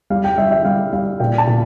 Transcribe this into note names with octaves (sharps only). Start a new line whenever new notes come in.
G3 F5
G5
G3 E5
E5
G3 F5
G3 F5
A#2 G5
A5
A#2